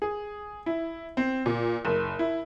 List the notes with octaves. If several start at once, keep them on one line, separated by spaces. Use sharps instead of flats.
G#4
E4
C4
A#2
F#1
E4